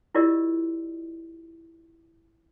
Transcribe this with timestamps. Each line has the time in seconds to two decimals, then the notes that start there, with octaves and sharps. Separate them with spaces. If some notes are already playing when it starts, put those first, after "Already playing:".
0.15 E4 F4 G4 A#4 D5 D#5